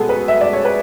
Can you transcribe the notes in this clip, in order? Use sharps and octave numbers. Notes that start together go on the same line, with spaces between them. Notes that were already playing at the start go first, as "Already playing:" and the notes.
Already playing: B2 G#3 B3 G#4 A4
B4
E5
D5
C#5
B4